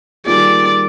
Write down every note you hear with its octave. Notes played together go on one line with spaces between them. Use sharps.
D#3 G3 A#3 F4 G#4 D5